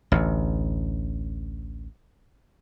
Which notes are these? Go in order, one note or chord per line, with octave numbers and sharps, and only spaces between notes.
A1 D2